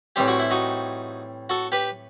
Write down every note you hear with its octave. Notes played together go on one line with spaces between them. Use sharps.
A2 E3 G3 C4 G4
F#4
E4
D#4 F#4
F#4 A4
G4 B4